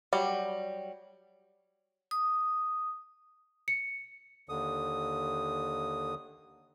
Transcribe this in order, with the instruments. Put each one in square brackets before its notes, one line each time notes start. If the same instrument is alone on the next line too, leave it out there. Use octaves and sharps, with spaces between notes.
[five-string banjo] F#3 G3
[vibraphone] D#6
[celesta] C#7
[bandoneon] D#2 D3 D#6